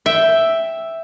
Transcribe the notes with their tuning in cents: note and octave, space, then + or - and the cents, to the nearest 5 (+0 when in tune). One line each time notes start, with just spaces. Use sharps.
E5 +0 G5 +0